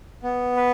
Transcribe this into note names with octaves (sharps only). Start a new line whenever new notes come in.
B3
B4